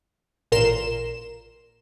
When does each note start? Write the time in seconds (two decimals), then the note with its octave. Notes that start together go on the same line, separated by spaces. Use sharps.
0.52 A1 A#2 A#4 C6 E7